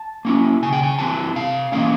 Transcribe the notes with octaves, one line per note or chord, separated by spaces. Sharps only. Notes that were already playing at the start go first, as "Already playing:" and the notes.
Already playing: A5
A#3 C#4 E4
C#3 G#5
G5
G#5
E3 G3 C4 A5
C3 F5
E3 G3 A#3 C#4 F5